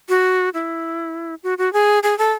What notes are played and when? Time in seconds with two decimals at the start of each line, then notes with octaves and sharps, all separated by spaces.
0.09 F#4
0.54 E4
1.43 F#4
1.58 F#4
1.73 G#4
2.03 G#4
2.18 A4